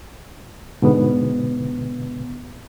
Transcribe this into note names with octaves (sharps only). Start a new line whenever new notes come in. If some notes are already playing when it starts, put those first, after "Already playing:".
G#2 B2 D3 B3